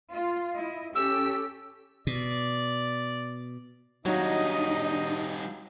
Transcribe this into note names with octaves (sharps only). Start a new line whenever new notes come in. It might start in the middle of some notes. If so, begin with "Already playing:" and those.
F4
E4 D#5
C#4 G4 A4 E6
B2 D5
F#3 G3 D4 D#4 F4 D#5